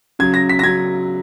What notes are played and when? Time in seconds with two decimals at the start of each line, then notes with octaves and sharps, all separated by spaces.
0.19 C#3 F#3 G#6
0.34 A#6
0.49 B6
0.59 A#6
0.63 C#3 F#3 G#6